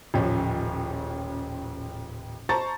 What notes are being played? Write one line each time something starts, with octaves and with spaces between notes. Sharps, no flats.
D#1 A1 C#3 F3 C#4
C5 A5 A#5 C#6 A6